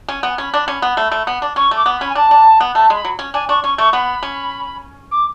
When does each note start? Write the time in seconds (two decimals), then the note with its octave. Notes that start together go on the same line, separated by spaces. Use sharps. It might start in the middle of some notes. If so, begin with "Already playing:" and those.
0.08 C#4 G#5
0.23 B3
0.38 C#4 B5
0.54 D4
0.68 C#4
0.82 B3
0.97 A3
1.12 A3
1.27 B3
1.42 D4
1.56 C#4 C#6
1.71 A3 D6
1.86 B3
1.96 C#4 B5
2.09 G#5
2.15 D4 A5
2.31 D4
2.60 B3
2.75 A3 A5
2.90 G#3 B5
3.05 F#3
3.19 C#4
3.34 D4 G#5
3.49 D4 C#6
3.63 C#4 C#6
3.78 A3 C#6
3.93 B3 B5
4.23 C#4
5.11 D6